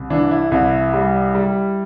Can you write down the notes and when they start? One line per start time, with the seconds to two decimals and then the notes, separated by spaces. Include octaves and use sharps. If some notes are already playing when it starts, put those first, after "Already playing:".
Already playing: C2
0.10 E3 D4
0.31 E4
0.51 C2 E4
0.93 G3
1.35 G3